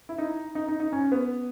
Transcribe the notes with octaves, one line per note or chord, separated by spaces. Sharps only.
E4
D#4
D#4
D#4
D#4
C#4
B3